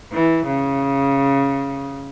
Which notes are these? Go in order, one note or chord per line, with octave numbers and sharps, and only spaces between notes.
E3
C#3